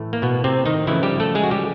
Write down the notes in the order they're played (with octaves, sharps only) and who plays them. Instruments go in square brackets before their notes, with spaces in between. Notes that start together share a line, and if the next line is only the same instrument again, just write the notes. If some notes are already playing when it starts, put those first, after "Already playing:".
Already playing: [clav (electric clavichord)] A2 E3 A3
A#3
B2 B3
C3 C4
D#3 D#4
C#3 E3 F3 A3 E4
G3 G4
A3 A4
G#3 G#4
F#4
G3 G4